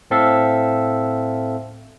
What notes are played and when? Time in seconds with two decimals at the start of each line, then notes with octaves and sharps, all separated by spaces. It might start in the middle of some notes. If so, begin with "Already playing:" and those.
0.11 A2 C4 A4 E5 F5